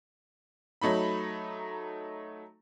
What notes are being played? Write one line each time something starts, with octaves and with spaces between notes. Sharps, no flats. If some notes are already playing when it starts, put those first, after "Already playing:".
F#3 A3 D#4 B5